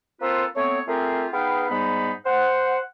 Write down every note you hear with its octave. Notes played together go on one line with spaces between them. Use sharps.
A#3 C4 F4 A4 B4 C5
A3 B3 C4 C#5
A3 C4 F4 G4 G#4 A#4
B3 D#4 G#4 B4 F5 G5
G#2 G3 B3 D#4 B5
C5 F#5